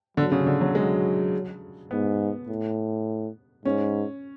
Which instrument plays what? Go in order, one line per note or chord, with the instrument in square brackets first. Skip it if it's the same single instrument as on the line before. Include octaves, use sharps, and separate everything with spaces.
[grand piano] D3 [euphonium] F#3
[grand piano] C#3
D3
F#3
[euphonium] F#3 [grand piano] G#3
[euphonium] G#2 [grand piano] B3
[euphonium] A2
[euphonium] G#2 [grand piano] C#4